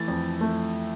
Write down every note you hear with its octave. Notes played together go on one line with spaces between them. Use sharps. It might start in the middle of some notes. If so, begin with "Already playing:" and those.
Already playing: E3 A3 A6
F2
A3